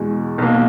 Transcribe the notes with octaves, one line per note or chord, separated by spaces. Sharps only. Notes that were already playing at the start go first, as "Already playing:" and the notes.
Already playing: E2 B2 G#3
B1 B2 A#3